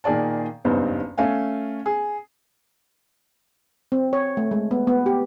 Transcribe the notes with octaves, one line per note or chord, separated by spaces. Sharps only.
A#2 D#3 G#4 D5 A5
F#1 E2 G2 B3 D#4 C5
A3 C#4 F5 G#5
G#4
C4
C#5
A3
G#3
B3
B3
G4